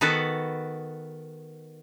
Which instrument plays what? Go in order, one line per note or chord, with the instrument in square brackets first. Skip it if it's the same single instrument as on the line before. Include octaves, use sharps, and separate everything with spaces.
[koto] D#3 B3 F#4 A4 B4